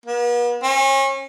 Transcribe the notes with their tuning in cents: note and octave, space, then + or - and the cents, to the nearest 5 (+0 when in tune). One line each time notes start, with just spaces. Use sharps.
B3 -45
C#4 -35